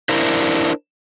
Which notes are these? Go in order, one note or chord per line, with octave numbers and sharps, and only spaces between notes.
D4 E4 A#4 C5